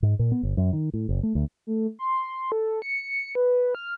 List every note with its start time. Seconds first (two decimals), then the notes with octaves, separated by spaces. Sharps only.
0.03 G#2
0.19 A#2
0.32 B3
0.43 G1
0.57 F#2
0.73 D#3
0.94 A2
1.09 F#1
1.23 A3
1.35 D2
1.67 A3
1.99 C6
2.52 A4
2.82 C#7
3.35 B4
3.75 F6